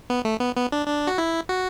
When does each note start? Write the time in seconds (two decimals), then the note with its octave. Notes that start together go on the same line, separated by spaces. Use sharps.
0.10 B3
0.25 A3
0.40 B3
0.56 B3
0.72 D4
0.88 D4
1.07 F#4
1.18 E4
1.49 F#4